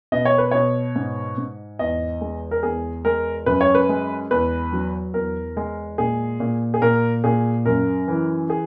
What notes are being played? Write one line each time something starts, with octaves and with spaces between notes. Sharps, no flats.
B2 D#5
C#5
B4
B2 C#5
G#2
G#2
E2 D#5
G#3
A#4
E2 G#4
G#3 A#4
F#2 B4
C#5
B4
G#3
E2 B4
F#3
E2 A#4
G#3
A#2 G#4
A#2
G#4
A#2 A#4
A#2 G#4
F#2 A#4
E3
G#4